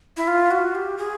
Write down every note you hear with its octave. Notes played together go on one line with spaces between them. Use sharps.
E4
F4
F#4
G4
G#4